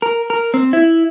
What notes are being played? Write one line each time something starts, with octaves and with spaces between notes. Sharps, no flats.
A#4
A#4
C4
E4